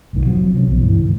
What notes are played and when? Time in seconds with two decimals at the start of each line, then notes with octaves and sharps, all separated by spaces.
0.13 B1 E2 A#2 D#3
0.25 F1 F3 F#3 C4
0.54 C3 F3 C4 C#4
0.67 B1 B2
0.81 C#2 G2 E3
1.03 D#2 G#2